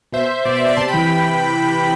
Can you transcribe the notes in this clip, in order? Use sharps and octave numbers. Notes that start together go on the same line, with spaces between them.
B2 C5 E5
B2 D5
E5
D5
C3 A5 C6
G5 B5
E3